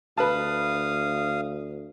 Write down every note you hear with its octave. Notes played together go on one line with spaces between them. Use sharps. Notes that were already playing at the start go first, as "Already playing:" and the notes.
D2 B4 F5 A5 D#6